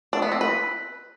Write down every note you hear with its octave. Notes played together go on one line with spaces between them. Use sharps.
D4
B3
C4
B4